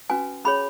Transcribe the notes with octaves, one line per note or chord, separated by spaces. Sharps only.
C#4 F#4 B4 G#5
C#4 G#4 C#5 B5